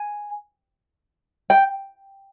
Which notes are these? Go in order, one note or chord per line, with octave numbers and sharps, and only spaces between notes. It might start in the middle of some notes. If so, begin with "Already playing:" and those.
Already playing: G#5
G5